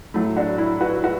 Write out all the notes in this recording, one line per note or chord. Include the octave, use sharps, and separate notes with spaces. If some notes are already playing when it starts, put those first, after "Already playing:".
A2 F#3 A3
D4 F#4
E4
F#4 B4
F#4 B4